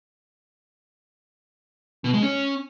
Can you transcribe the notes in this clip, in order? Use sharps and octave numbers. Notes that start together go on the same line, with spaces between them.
B2
G#3
C#4